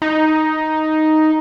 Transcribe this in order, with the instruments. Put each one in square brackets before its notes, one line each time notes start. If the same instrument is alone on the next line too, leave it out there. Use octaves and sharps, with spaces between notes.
[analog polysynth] D#4